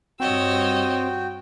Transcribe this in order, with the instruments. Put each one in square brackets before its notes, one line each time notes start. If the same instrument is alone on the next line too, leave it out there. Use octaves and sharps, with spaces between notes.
[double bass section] G2 [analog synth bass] C4 [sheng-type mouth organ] F#4 G5 [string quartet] C#5 D#5 E6